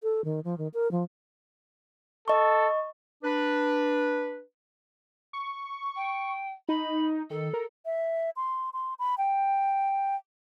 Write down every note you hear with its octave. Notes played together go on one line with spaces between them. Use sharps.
A4
D#3
F3
D#3
A#4
F3
A4 D#5 C#6
D4 B4
C#6
G5
D#4 B5
D#3 A4
A#4
E5
C6
C6
B5
G5